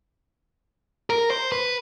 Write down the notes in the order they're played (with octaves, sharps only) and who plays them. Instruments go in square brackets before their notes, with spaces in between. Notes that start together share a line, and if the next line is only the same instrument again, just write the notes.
[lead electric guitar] A#4
C5
B4